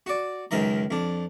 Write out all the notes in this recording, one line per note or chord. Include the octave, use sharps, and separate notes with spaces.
F#4 D5
C#2 F#2 D#3 D#5 A#5
F2 D4